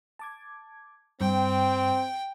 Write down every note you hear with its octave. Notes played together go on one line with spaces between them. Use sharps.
A5 D6 G#6
G2 C4 G5